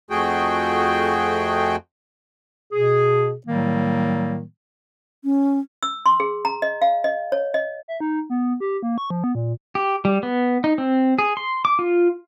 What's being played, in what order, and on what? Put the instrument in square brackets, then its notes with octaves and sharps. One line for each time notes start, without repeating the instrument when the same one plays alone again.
[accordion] F2 A3 F#4 G#4 G5
[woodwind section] B2 G#4
A2 D#3 F#3 G3 A#3
[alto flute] C#4
[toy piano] E6
C6
G#4
A#5
D#5
F5
D#5
C#5
D#5
[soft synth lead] E5
D#4
B3
G4
A#3
C#6
F3
B3
A#2
[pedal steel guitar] G4
G3
B3
D#4
C4
G#4
C6
D6
F4